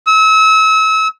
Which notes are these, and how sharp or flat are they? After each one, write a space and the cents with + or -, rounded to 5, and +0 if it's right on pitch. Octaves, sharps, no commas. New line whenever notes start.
E6 -35